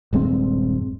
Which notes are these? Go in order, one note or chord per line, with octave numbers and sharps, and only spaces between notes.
D#1 G2 G#3 C4